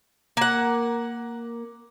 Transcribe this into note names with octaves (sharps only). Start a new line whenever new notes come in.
A#3 F#5